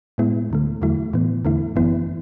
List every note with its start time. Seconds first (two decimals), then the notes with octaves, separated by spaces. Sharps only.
0.18 A2 G#3 B3 E4
0.50 D2 D3 A3
0.82 E2 D3 F#3 A3 E4
1.13 A2 E3 B3
1.45 E2 D3 A3 E4
1.76 G#1 F#2 E3 B3 E4